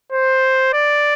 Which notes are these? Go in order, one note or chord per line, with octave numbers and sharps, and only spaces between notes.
C5
D5